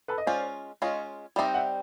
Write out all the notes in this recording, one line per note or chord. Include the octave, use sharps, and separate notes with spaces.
A4 B4
D#5
G#3 C#4 F4 C5 D5
G#3 C#4 F4 C#5 D#5
G3 C4 D#4 D5 E5
E5 F#5